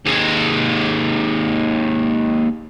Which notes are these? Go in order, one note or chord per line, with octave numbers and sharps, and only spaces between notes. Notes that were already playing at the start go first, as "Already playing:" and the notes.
D#2 G#3